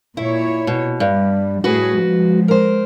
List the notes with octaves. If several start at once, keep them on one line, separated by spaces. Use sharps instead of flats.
A#2 E4 C#5
B2
G2 G3
A2 F#4 G#4 B4
F3 G#3
A#4 C5